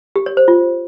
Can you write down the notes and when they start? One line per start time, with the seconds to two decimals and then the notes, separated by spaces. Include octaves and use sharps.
0.16 G4
0.26 C#5
0.37 C5
0.48 F4